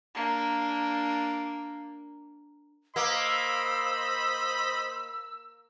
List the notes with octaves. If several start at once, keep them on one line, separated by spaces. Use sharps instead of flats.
A#3 D4
A#3 C5 D#5 B5 E6